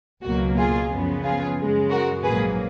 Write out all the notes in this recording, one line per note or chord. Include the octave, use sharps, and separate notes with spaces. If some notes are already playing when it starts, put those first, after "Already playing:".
C#2 B2 F#3 A#3 F#4
F4 G#4
F#2 C#3 F3 B3
F4 G#4
F#2 C#3 G#3
F#4 A#4
A#1 G#2 F#3 A#3 G#4 B4